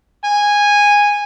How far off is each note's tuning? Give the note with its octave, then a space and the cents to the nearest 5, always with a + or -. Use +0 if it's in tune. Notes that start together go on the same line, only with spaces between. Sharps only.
G#5 -10